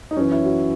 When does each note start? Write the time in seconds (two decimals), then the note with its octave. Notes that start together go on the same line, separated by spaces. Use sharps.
0.11 D#4
0.17 F#2 E3 C#4
0.32 E4
0.45 F#4